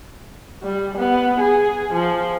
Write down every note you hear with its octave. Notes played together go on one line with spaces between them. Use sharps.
G3
B3
G#4
F3